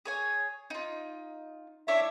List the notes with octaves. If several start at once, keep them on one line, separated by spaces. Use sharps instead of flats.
G#4 C#5 G#5
D#4 F4
D4 E4 C#5 E5